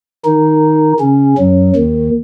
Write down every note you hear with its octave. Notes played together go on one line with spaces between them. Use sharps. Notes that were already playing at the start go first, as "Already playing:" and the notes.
D#3 D#4
C#3 C#4
F#2 F#3
D#2 D#3